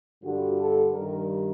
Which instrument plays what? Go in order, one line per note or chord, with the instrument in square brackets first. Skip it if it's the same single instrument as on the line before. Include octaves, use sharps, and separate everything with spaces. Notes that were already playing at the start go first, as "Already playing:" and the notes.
[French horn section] G2 D3 G3 F#4
A4
G2 D#3 G3 A#4